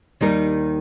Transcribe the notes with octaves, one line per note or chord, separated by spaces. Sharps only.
D#2 D#3 G3 D#4 A#4